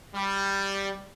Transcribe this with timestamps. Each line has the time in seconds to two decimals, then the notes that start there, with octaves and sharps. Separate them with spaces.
0.15 G3